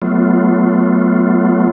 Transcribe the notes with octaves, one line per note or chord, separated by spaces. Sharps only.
F#3 A3 B3 F4